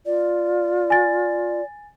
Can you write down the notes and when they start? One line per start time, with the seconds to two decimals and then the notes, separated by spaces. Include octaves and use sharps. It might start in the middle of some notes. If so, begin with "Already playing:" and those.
0.06 F4 D5
0.90 G#5 A6